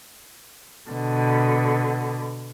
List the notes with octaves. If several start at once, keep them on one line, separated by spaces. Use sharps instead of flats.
B2 D3